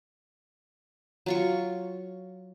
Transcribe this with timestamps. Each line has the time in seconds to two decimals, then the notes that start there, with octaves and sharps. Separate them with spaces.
1.26 F#3 F4 C#6